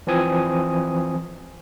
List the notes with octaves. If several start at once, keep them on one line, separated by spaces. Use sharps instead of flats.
E3 F3 C4 G#5 D#6